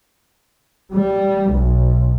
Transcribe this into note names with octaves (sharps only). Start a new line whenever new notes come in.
G3
B1